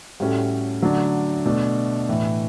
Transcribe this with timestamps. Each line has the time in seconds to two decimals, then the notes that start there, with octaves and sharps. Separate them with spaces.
0.20 A2 G3 C#4 F#4 A4
0.82 D3 F#3 A3 D4
1.45 B2 A3 D4
2.09 A2 E3 A3